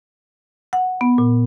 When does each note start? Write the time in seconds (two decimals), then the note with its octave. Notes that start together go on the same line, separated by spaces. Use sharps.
0.73 F#5
1.01 B3
1.18 A#2